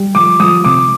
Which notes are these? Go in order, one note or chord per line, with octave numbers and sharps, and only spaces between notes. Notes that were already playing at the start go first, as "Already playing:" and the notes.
Already playing: G3
F3 D6
F3 D#6
C3 D6